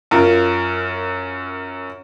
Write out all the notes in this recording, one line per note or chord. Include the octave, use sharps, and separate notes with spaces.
F#2 F4 A#4